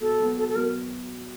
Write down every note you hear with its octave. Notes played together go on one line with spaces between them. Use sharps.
B2 A4
F#3 B3
B2 A4
A4
F#3 B3 A#4